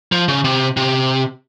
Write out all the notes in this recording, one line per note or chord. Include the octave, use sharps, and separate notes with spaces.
F3
C#3
C3
C3